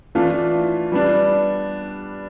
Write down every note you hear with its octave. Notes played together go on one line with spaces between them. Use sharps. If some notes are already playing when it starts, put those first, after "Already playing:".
E3 A3 D4 F4
G3 B3 D4